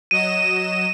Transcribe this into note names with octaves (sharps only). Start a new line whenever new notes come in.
F#3 D#5 D#7 E7